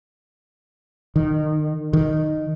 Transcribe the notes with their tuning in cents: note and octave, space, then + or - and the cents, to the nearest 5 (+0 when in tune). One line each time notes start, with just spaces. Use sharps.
D#3 -25
D#3 -10